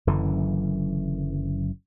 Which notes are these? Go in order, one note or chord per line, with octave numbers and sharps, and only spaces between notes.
F#1 F#2 D3 E3